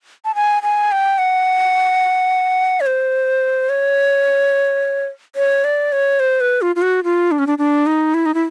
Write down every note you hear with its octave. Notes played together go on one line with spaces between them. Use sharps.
A5
G#5
G#5
G5
F#5
C#5
C5
C#5
C#5
D5
C#5
C5
B4
F4
F4
F#4
F4
D4
C#4
D4
D4
D#4
E4
D#4
E4